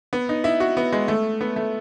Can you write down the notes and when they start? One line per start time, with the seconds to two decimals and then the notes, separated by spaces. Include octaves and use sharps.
0.13 B3
0.29 D#4
0.44 E4
0.60 F#4
0.77 B3
0.93 G#3
1.08 A3
1.41 B3
1.56 A3